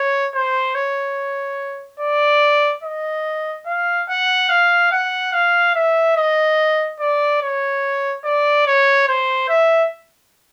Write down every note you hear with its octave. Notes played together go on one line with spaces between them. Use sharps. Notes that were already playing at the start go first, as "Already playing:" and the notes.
Already playing: C#5
C5
C#5
D5
D#5
F5
F#5
F5
F#5
F5
E5
D#5
D5
C#5
D5
C#5
C5
E5